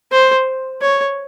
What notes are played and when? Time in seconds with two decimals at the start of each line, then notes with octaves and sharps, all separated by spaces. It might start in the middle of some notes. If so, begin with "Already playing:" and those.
0.12 C5
0.82 C#5